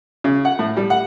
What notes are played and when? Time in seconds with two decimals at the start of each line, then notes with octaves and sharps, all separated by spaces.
0.24 C#3
0.45 F#5
0.59 A2
0.77 G3
0.90 F#5